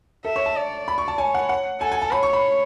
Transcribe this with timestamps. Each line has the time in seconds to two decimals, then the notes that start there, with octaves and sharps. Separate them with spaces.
0.25 A4 E5
0.36 C#5
0.46 A5
0.56 D5
0.88 B5
0.98 C#6
1.08 A5
1.18 C#5 G#5
1.34 F#5
1.49 F#5
1.81 A4 G#5
1.92 G#5
2.02 A5
2.12 C#5 B5
2.23 C#6
2.33 B5